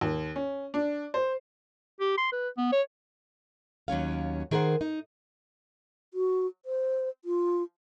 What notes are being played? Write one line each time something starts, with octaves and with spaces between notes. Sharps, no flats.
D#2
C#4
D4
C5
G4
C6
B4
B3
C#5
D#2 F#3 C#4 F5
D#3 G#4 A#4 C5 F#5
D#4
F#4
C5
F4